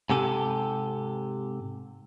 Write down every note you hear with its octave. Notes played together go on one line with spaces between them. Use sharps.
G#2 C3 G4 A4 G#5